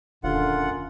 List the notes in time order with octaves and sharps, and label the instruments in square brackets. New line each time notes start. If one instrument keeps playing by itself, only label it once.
[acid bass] D#1 [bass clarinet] F#2 [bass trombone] D3 [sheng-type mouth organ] F4 F#5